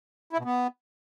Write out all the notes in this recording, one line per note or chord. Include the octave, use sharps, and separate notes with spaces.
E4
B2
B3